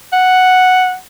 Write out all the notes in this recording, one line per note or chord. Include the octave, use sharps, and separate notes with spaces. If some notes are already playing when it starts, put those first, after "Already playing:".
F#5